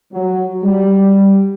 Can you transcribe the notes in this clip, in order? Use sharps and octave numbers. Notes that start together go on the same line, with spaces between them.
F#3
G3